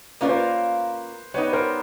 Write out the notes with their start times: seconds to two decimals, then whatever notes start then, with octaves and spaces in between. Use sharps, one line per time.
0.21 A#3 C#4 F4 A#4 B4 D5
0.29 C5
0.36 B4
1.34 G3 B3 D#4 B4 C#5
1.53 A#4 C5